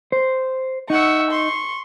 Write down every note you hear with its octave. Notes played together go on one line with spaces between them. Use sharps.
C5
D#4 E5 F#5 C#6
C6 C#6